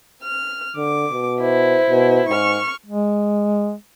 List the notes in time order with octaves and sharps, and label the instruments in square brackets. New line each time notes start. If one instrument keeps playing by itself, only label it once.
[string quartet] F6
[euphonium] D3 [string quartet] D6
[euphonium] B2
[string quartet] E4 C5
[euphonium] B2
[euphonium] G#2 [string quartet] C#6 F6
[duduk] G#3